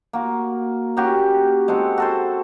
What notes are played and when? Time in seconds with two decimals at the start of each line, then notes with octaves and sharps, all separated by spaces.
0.13 A#3 F#4
0.97 A#3 C#4 F#4 G4
1.68 G#3 C4 A4 F#5
1.98 F#4 A4 C5